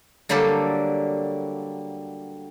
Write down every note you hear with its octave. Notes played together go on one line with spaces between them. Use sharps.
D3 F#3 G3 A#3 G4 A4